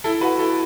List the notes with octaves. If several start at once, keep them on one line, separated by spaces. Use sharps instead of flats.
E4 A4
F#4 B4
E4 A4